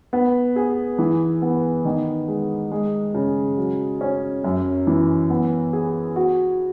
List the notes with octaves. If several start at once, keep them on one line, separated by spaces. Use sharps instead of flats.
B3
G#4
E3
B3
D#3
G#3
G#3
C#3
F#3
C#4
F#2
E3
B3
G#4
F#4